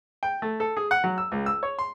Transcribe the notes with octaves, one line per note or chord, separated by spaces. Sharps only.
G5
A3
A4
G#4
F#5
F#3
E6
C#2
E6
C#5
C6